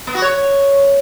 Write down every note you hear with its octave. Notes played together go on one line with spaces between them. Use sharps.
B3
F#4
C#5